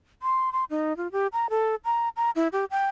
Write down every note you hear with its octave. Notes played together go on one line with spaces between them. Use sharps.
C6
C6
D#4
F4
G4
A#5
A4
A#5
A#5
E4
G4
G5